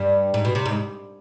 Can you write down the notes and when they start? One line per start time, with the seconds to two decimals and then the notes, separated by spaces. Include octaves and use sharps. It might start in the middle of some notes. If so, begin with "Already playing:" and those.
Already playing: G2
0.34 G#2
0.45 B2
0.55 C3
0.66 G#2